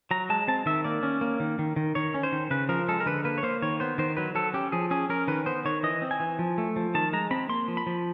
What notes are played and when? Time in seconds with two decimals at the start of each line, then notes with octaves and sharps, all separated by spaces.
0.11 F#3 A#5
0.30 G#3 A5
0.48 C4 A5
0.66 D#3 E5
0.84 A#3 D5
1.03 C#4
1.21 A#3
1.40 D#3
1.59 D#3
1.76 D#3
1.95 D#3 C#5
2.14 C#4
2.23 C5
2.32 D#3
2.51 C#3 B4
2.69 F3 A#4
2.88 G#3 A4
3.00 A#4
3.06 D3 B4
3.24 A#3 B4
3.38 C#5
3.43 A#3 C5
3.62 D#3 C#5
3.80 B3 C5
3.98 D#3 C5
4.17 F#3 B4
4.35 F#3 A4
4.54 C#4 G4
4.72 F3 G#4
4.91 C#4 G#4
5.10 C#4 A#4
5.28 D#3 B4
5.46 B3 C5
5.65 D#3 C#5
5.83 E3 D#5
6.02 C4
6.11 G#5
6.20 E3
6.39 F3
6.58 A3
6.76 F3
6.95 D#3 A5
7.13 G#3 A#5
7.31 C4 B5
7.49 A#3 C6
7.68 F3
7.77 B5
7.86 F3